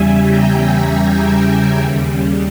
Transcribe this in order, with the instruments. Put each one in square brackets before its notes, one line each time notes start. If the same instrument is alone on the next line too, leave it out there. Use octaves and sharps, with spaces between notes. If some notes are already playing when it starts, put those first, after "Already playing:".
Already playing: [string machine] E2 C#3 G3 E5 G#5
G5 A#5
E5 G#5
D#2 C#3 G3